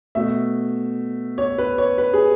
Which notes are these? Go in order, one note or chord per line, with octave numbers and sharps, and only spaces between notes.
B2 A3 E5
C#5
B4
C#5
B4
G#4